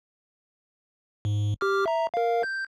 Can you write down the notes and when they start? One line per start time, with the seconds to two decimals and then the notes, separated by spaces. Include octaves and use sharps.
1.25 G#2
1.61 G4 D6 F6
1.86 E5 A#5
2.14 A#4 F5
2.43 G6